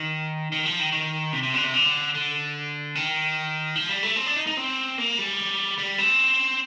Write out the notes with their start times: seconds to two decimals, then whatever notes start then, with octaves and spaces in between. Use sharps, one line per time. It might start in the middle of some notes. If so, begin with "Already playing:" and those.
Already playing: D#3
0.52 D#3
0.66 F3
0.80 D#3
0.92 D#3
1.33 C3
1.43 C3
1.54 D3
1.64 C3
1.74 D3
2.15 D3
2.95 D#3
3.76 F3
3.89 G3
4.03 A3
4.16 C4
4.26 D4
4.36 D#4
4.47 D#4
4.57 C4
4.98 A#3
5.18 G3
5.78 G3
5.98 C4